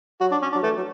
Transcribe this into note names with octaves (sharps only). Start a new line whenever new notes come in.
F#3 F#4
D4
C#4
D4
F#3
E3 A3
F#3